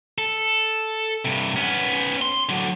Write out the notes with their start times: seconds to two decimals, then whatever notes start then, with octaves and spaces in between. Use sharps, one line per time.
0.18 A4
1.25 G2 C3
1.56 B3 C#4
2.22 C6
2.49 D3 F#3